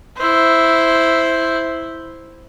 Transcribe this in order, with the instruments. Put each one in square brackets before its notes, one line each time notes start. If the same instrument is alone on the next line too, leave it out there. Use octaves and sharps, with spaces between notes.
[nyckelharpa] E4 C5